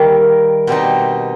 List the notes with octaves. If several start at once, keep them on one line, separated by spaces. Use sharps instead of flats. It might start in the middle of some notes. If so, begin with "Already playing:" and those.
Already playing: D#3 G3 A#3
B2 G3 C4 D#4